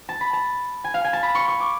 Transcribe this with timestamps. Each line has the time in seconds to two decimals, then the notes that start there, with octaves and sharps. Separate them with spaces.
0.09 A5
0.21 B5
0.33 A5
0.84 G#5
0.94 F5
1.04 G#5
1.13 A5
1.23 B5
1.35 C#6
1.48 C#6
1.60 D6